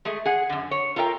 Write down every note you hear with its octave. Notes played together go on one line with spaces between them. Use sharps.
G#3 A3 G#4
G#4 F#5
F#2 D3
C#5
F4 A4 A#4 E5 G5